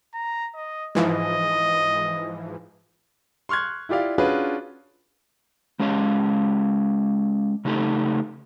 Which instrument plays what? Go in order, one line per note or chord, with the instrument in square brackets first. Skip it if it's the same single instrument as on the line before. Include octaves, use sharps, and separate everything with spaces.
[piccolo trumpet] A#5
D#5
[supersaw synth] G#2 E3 F3 [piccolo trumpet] D#5
[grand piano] C6 C#6 F6 F#6 G#6
E4 F4 G4 D5 F5
C#4 D4 F4 F#4 G#4 B4
[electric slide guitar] G#3 C#4 G4 C#5 F5
C#3 A3 D#4 G4 A4